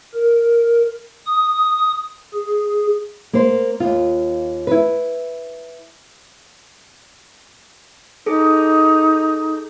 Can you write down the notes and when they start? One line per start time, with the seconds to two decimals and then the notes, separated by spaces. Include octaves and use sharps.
0.14 A#4
1.27 D#6
2.34 G#4
3.33 A#3 C5
3.80 D#2 F4
4.67 E4 B4
8.26 D#4 G#4 A4